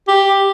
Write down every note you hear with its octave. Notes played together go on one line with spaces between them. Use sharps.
G4